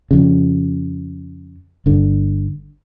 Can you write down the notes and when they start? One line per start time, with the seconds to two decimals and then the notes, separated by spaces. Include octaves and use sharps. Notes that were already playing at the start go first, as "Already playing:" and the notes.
0.11 F2 C#3
1.86 G1 D3